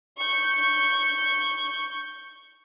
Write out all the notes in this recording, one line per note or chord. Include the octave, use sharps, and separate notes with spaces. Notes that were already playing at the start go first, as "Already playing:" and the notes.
C#6 G6